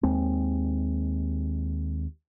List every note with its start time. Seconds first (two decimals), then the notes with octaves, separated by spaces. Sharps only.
0.03 D#2 G#3 C4